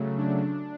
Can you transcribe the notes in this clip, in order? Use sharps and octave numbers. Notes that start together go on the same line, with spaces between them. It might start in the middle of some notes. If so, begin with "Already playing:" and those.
Already playing: C#3 F#3 A3
D4